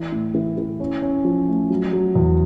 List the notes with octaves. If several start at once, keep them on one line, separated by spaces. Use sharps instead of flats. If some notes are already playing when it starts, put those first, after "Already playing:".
Already playing: E3
A2
E3
E3
C#4
C#4
F3
A3
F#3
F#3
E2